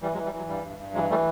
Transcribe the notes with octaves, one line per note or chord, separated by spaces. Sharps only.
E3 G3
F#3 G#3
E3
G3
E3 F#3
G2 G3
G2
G2
E3 F#3 G#3
E3 G3 A3